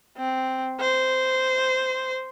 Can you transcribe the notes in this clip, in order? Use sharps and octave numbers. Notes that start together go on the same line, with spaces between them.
C4
C5